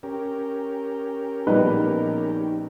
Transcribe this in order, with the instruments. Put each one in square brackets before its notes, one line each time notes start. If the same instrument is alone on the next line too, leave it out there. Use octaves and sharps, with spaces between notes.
[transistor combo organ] C#4 G4 A#4
[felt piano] A#1 G3 B3 [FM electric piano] D#4 [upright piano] B4